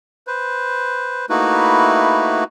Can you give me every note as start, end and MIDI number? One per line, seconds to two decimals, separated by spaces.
0.27 1.26 71
0.27 1.26 72
1.30 2.44 57
1.30 2.44 58
1.30 2.44 63
1.30 2.44 64
1.30 2.44 66
1.30 2.44 71